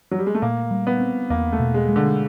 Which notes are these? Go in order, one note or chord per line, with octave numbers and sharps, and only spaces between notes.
F#3
G3
G#3
A3
A#2 A#3
G3
B3
C4
E2 A#3
A3
B2
G#3
G#3
D3